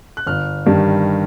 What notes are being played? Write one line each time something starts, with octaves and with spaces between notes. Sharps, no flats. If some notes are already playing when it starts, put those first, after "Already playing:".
F#6
G1 F6
G2 D#3 G3